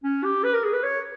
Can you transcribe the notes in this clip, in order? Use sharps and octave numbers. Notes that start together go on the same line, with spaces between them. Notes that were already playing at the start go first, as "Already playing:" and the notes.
C#4
G4
B4
A#4
G#4
B4
C#5